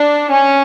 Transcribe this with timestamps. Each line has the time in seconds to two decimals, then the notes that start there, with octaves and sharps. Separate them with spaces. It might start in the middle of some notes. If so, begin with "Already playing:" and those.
Already playing: D4
0.32 C#4